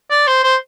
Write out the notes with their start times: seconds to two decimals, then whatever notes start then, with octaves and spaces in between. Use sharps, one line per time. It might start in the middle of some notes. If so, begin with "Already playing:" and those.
0.10 D5
0.27 C5
0.43 C5